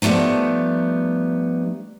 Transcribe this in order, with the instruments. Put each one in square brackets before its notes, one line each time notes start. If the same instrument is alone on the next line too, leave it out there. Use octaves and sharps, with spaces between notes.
[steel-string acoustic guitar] F3 G3 A3 B3 D#4